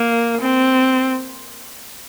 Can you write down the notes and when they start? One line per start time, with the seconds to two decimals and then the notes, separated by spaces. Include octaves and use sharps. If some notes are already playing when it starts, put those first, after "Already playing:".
Already playing: A#3
0.41 C4